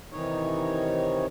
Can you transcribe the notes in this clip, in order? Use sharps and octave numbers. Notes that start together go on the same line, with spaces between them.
C3 D#3 E3 D#4 C#5